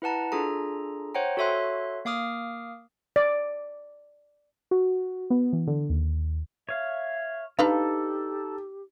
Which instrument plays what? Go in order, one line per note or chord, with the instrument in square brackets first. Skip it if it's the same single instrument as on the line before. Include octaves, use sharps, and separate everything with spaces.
[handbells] E4 B4 F#5 A5 A#5
D4 F4 G#4 A4 A#5
C5 C#5 F#5 G5 A#5
F#4 A4 C#5 E5 C6 F#6
A#3 F5 D6 D#6 F6
[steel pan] D5
[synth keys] F#4
B3
E3
D3
D#2
[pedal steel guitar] C#5 F5 [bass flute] E5
[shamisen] D4 B4 F5 [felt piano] D#4 [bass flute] G4 [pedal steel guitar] A4